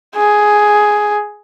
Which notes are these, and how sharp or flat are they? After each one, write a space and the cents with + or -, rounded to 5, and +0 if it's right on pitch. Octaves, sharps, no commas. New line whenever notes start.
G#4 +5